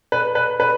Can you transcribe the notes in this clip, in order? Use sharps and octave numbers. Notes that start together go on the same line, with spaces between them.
B4
B4
B4